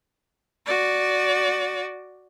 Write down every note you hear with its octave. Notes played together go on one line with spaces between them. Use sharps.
F#4 D5